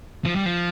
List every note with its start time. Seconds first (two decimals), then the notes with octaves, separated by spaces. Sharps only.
0.25 F3
0.36 G3
0.46 F3